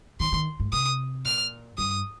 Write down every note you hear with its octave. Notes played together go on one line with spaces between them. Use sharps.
D#3 C6
D#3
G#2
C3 D#6
A#2 F6
G2 D#6